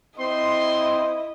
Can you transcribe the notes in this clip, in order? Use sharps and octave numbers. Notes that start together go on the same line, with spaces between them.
C4 E4 D#5 C6